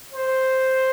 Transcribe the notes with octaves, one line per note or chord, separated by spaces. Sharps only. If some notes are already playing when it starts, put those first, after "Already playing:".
C5